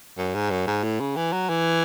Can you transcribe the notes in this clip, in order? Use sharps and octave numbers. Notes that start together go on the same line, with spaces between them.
F#2
G#2
F#2
G#2
A2
C#3
E3
F#3
E3